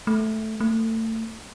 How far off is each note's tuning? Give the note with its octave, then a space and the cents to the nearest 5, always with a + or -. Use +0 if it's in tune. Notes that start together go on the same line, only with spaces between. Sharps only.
A3 -5
A3 +30